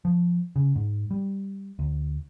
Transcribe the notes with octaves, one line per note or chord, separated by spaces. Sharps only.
F3
C#3
G#2
G3
D2